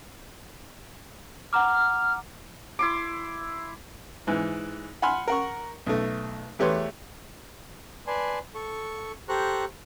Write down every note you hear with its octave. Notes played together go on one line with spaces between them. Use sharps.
F#5 A#5 D6 F6
E4 C6 D6
G#2 E3
F#5 G#5 B5 C6 F6
A#4 F#5 C#6
B1 A3
E2 A3 G4 B4 C#5 C6
B4 D5 G#5 A5 C6
A4 C#6
G4 A4 C5 A#5 C#6 F#6